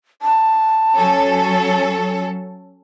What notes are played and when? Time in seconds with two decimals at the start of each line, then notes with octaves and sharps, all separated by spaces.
0.22 A5
0.97 F#3 C#4 A4